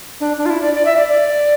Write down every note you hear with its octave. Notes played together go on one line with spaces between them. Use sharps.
D4
D4
F4
E4
D5
D5
E5
D5
D5